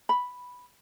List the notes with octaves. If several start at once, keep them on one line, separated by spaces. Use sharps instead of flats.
B5